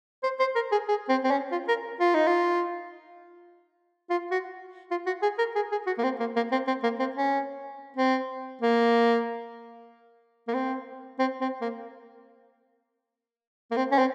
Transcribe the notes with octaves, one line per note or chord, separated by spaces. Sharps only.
C5
C5
A#4
G#4
G#4
C4
C4
C#4
F4
A#4
F4
D#4
F4
F4
F#4
F4
F#4
G#4
A#4
G#4
G#4
F#4
A#3
C4
A#3
A#3
C4
C4
A#3
C4
C#4
C4
A#3
A#3
C4
C4
C4
A#3
A#3
C4
C#4
C4